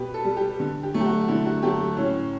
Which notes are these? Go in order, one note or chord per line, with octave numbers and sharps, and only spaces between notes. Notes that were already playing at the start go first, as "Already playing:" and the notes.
Already playing: B2 G4 B4
A4
G3
G4
D3
G4
F#3 A3
G4
F#4
D3 E4
F#4
F#3 A3 G4
A2 C#4